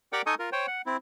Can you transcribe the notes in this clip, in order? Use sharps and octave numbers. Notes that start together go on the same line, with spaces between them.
G4 A#4 D5 F#5 G5 D6
D#4 A4 D#5 G#5 C#6 D#6
F4 A#4
C5 C#5 G5
F#5
C4 E4